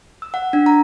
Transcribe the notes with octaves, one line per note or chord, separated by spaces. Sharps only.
E6
F#5
D4
A#5